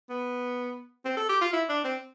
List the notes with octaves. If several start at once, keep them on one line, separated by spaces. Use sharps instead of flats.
B3
C4
A4
G4
F4
E4
D4
C4